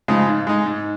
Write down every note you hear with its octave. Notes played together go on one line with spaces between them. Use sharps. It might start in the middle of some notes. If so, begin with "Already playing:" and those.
C#3 F3 G#3 D#4
G#2
G#3 D#4
G#2